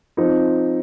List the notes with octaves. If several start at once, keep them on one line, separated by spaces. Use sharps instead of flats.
F3 C4 D#4